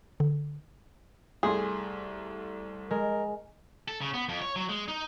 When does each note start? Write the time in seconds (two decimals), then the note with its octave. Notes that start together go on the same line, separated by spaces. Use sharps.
0.20 D3
1.43 C2 A3 G#4 C6
2.90 G#3 A#4
3.88 A4
4.01 C#3
4.14 B3
4.29 F2
4.42 C#5
4.56 F#3
4.69 G#3
4.88 D#4